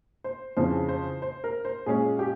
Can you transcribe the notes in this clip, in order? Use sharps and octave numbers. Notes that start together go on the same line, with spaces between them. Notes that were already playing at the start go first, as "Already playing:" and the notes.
C5
F2 C#3 E3 C5
C5
C5
A#4
C5
A#2 G#3 C#4 G#4
G4